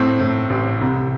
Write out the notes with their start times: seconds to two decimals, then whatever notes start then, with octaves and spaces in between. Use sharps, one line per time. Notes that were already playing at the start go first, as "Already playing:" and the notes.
Already playing: A2 C4
0.20 A2
0.50 A1
0.81 C2